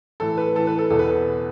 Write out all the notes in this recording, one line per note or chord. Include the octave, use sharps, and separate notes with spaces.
A2 E3 A4
B4
A2 E3 A4
B4
A4
E2 B2 A4
B4